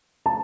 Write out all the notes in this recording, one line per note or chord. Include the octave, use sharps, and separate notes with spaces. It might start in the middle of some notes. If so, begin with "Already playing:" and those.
A5